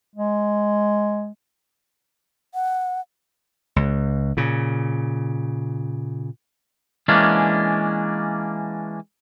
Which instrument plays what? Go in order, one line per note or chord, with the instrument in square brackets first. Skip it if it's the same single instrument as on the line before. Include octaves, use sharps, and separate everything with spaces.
[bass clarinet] G#3
[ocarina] F#5
[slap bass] C#2
A#2 C#3
[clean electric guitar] E3 G#3 A#3 C#4 D4